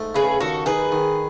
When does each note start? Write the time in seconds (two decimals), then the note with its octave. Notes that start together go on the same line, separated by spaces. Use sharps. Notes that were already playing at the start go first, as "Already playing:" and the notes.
Already playing: G#2 A3
0.15 C#3 G#4 B4
0.40 D#2 F#4 A4
0.66 D#4 G#4 B4
0.92 D#3